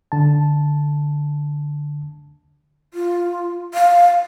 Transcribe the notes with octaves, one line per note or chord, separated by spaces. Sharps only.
D3 A5
F4
F5